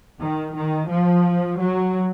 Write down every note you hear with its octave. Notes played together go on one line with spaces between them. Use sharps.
D#3
D#3
F3
F#3